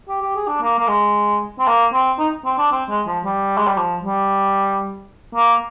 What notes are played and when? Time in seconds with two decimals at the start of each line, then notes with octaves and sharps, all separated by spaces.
0.08 G4
0.22 G4
0.36 G#4
0.48 D4
0.62 A#3
0.79 A#3
0.88 G#3
1.59 C4
1.67 A#3
1.94 C4
2.19 D#4
2.45 C4
2.58 D4
2.72 C4
2.90 G#3
3.07 F3
3.24 G3
3.57 G#3
3.67 G3
3.77 F3
4.03 G3
5.35 A#3